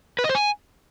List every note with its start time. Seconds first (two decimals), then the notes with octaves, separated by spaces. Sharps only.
0.19 B4
0.24 D#5
0.29 C5
0.35 G#5